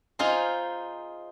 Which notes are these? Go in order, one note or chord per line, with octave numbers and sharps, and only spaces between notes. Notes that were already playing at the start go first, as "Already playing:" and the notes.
D#4 F4 G#4 C5